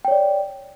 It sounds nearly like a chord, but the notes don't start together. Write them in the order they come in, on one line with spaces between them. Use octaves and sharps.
G5 C#5 D5